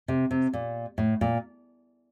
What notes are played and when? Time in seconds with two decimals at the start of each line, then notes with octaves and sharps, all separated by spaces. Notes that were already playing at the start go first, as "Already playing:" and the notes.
0.08 C3
0.31 C3
0.53 A#2
0.98 A2
1.21 A#2